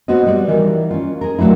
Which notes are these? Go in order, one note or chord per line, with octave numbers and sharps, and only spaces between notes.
B3 C4 F#4 B4 D#5
G3 B4 D5
D#3 E3 G3 G4 A#4
C#4 F4
G#4 A#4
D#3 F#3 A3 D4 E4